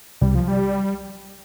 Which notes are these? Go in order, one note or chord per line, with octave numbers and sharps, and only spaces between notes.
C2 G3
F3
G3